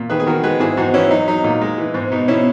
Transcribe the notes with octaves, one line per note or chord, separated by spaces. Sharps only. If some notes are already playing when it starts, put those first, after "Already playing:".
Already playing: A#2
D#3 G#4 B4
G#4
D#3 F#4 A#4
G#3 G#4 B4
G#2 E4 G#4
G#2 D#4 F#4
E3 C#4 E4
F#3 D#4
F#3 D#4
A#2 D#4
G#3
E3
G#2
B2 D#4
B2 C#4 E4